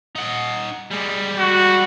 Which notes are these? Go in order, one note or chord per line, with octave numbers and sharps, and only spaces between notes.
D#4 F#5
G3 G#3
F#4